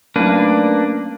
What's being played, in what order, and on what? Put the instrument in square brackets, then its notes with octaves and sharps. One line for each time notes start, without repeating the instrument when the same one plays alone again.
[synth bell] F#3 A3 C#4 [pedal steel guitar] A#3 D4 B4